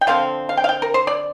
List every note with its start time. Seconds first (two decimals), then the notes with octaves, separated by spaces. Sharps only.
0.01 G5
0.07 D3 F3 C4 F5
0.49 F5
0.57 G5
0.64 F5
0.69 G5
0.82 A#4
0.94 C5
1.07 D5